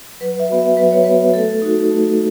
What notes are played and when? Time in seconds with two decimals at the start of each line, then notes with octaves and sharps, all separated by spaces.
0.20 F#3 B4
0.40 E5
0.49 B3 F#4
0.59 E5
0.77 F#3 B4
0.91 C#5
1.04 F#4 B4
1.10 B3
1.34 A3 A4
1.62 D#4 F#4
1.90 A3